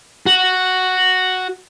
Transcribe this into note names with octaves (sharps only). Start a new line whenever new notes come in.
F#4